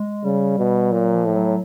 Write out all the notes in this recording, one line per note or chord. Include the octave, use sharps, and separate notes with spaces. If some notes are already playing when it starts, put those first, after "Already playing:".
Already playing: G#3
C#3 G3
B2
A#2 F#3
F3
A2
F#3